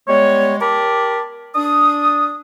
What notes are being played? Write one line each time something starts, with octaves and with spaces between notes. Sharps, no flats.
G3 G#3 B3 C#5
G4 A#4 A5 B5 D6
D4 D#6